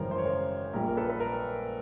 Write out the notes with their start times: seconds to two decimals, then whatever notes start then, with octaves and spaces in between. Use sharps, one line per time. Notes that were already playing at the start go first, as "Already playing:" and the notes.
Already playing: G#1 F#2 C#3 E3 G3 A#4 C5
0.11 C5
0.18 C#5
0.25 A#4 C5
0.73 A#1 A#2 G3 A#4
0.89 A#4
0.97 A4 B4
1.09 B4
1.20 A#4